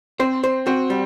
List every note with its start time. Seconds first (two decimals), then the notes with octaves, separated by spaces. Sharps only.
0.19 C4 C5
0.44 C5
0.67 C4 F#4
0.90 G3